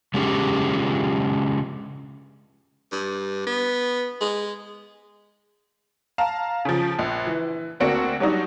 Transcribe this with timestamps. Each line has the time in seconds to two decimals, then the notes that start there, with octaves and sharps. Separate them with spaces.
0.14 C#3 G#3 C#4 D4 G4 G#4
2.92 G2
3.47 B3
4.21 G#3
6.18 F5 A5 A#5
6.65 C#3 F3
6.99 A#1
7.27 E3
7.80 D2 A#3 C4 D4 F#4 C#7
8.20 F#3 G3 D4 D#4 F#4